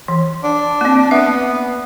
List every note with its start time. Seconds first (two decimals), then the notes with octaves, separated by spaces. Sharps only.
0.08 E3
0.44 D4
0.81 A#3 C4
1.11 B3 E5